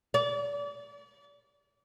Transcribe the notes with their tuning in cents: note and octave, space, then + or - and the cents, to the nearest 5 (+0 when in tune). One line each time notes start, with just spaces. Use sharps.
D5 -35